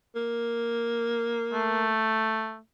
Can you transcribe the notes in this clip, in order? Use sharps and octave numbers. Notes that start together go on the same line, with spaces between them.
A#3
A3